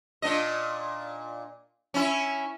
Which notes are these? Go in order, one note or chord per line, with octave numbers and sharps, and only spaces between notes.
A#2 D4 D#5
C#4 E4